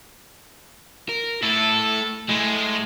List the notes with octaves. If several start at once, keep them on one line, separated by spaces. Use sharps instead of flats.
A#4
A3 E4 A4
G#3 A3 E4